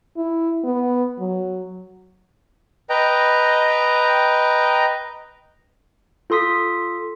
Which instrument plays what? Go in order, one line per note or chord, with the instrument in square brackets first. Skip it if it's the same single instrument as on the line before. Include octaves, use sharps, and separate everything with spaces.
[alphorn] E4
B3
F#3
[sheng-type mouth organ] B4 D#5 G5 A#5
[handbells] F4 A4 C6 D#6 B6